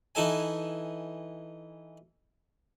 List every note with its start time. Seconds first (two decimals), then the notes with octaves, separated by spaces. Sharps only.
0.15 E3 D#4 A4 E5 G#5